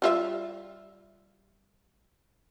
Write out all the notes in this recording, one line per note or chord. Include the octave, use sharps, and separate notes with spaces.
G3 F4 E5